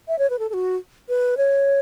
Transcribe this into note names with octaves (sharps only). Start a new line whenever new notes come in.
E5
C#5
B4
A4
A4
F#4
B4
C#5